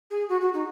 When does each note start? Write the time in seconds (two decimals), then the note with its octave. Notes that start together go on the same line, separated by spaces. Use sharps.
0.10 G#4
0.28 F#4
0.40 F#4
0.53 D#4